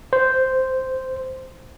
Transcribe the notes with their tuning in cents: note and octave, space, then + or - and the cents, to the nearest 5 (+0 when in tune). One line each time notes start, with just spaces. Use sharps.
C5 -5